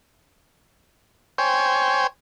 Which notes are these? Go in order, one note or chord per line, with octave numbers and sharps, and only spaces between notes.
C5 C#5 G5 G#5